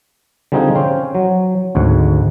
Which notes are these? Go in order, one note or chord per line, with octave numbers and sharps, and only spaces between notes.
D3 G3 C4 D#4 F4 G#4
C#4 C5 F5 G5
F#3
G#1 D2 G#2